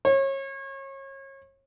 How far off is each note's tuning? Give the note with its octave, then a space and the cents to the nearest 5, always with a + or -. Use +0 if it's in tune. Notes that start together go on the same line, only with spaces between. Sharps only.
C#5 -30